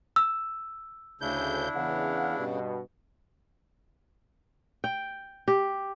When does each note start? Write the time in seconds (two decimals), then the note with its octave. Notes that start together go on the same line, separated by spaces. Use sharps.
0.16 E6
1.21 D2 C#3 D4 E4 G6
1.75 E2 C#3 F5 F#5
2.37 G2 B2
4.84 G5
5.48 G4